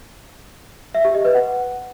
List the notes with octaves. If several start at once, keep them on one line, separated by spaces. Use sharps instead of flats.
E5
G4
D#5
B4
F#5